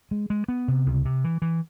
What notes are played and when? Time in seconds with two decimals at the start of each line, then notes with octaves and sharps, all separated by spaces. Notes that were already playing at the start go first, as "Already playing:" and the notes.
0.11 G#3
0.30 G#3
0.48 B3
0.68 C3
0.86 C#2
1.05 C3
1.24 E3
1.42 E3